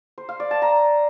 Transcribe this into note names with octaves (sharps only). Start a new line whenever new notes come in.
C5
F5
D5
A5
A#5